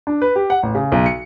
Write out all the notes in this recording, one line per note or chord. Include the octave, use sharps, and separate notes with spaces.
D4
B4
G4
F#5
A1
C#3
B1
C#7